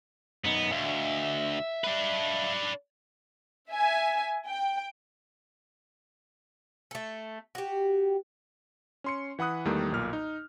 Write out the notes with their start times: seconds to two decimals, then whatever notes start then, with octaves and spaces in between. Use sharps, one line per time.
0.44 F#2 B3 D#4
0.72 D2 E5 F5
1.84 D4 B4
3.70 E5 G#5
4.48 G5
6.91 A3 A4
7.55 F#4 G4
9.04 C#4 C6 C#7
9.39 E3 F#5 B5 D#6 F#6
9.65 E2 D#3 G3 A3 A#3
9.92 B1 A#2 F6
10.13 D#4